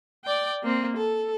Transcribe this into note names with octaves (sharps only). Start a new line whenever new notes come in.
D5 G5
A#3 C4
A4